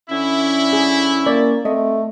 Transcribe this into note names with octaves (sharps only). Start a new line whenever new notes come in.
D3 C#4 E4
G#4
A#3 D5
A3 C4 D#5